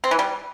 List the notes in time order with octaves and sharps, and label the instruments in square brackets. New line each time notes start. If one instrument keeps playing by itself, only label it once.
[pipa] C4
E3
G3